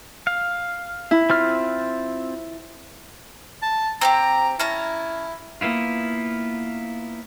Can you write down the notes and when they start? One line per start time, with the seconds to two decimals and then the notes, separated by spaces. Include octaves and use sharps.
0.27 F5
1.11 E4
1.30 C4 F4 F6
3.62 A5
4.01 C4 D#4 G4 A#5
4.59 C#4 E4 A5 A#5
5.61 A#3 B3 E4 F4